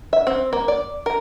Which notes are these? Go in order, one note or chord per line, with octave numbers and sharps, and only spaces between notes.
E5
C4
A#3
D5
A#4